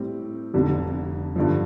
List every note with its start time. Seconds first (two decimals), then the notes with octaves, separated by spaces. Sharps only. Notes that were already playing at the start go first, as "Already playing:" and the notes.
Already playing: A2 G3 C4
0.54 F1 F2 D3 G3
1.36 G2 D3 F3